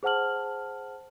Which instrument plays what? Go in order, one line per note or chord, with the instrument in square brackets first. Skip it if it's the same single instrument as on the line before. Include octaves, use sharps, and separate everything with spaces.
[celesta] G#4 C5 F#5 A5 F6 F#7